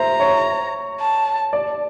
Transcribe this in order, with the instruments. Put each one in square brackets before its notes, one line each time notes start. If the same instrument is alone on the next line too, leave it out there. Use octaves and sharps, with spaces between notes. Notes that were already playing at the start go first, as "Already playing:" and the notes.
Already playing: [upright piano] C5 E5 [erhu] A#5
[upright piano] C#5
[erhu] A5
[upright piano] D5